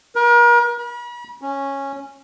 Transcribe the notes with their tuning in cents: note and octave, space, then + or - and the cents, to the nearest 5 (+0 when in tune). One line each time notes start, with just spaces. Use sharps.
A#4 +40
B5 -40
C#4 -10